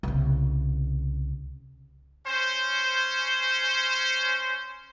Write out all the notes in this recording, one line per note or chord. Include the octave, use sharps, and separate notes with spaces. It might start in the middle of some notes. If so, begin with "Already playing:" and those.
C2 C#3
C#4 C5